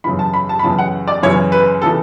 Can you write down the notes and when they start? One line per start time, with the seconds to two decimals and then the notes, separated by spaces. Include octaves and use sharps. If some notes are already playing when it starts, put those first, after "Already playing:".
0.04 F#2 C#3 E3 B5
0.19 A5
0.34 B5
0.49 A5
0.59 B5
0.64 F#2 C#3 E3 A5
0.78 F#5
1.08 D5
1.23 F#2 C#3 E3 C#5
1.52 B4
1.82 C#3 E3 A4